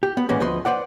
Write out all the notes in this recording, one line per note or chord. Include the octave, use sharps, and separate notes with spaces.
G4
B3
A2 E3 G#3 A#3 B3 C#4
D2 F3 B4 D#5 C6
B4 C5 D5 F#5